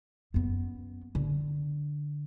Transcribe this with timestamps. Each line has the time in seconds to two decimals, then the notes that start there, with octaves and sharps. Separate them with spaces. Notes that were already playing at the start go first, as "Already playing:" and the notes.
0.34 F#2 B3
1.15 D3